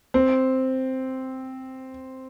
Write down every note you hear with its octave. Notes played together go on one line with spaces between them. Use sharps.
C4